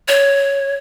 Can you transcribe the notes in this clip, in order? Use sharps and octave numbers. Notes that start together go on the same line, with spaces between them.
C#5